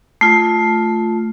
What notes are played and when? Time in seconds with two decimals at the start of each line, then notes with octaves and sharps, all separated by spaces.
0.21 A3 F4